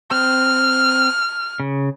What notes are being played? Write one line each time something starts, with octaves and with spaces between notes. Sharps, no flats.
C4 F6
C#3